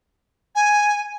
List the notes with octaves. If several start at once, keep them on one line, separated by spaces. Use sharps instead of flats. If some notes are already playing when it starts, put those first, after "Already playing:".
G#5